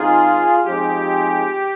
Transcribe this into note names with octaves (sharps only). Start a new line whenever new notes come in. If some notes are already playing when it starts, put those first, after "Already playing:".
Already playing: D#3 G#3 C4 D#4 F4 G#4
F3 G#3 C4 D#4 G4 G#4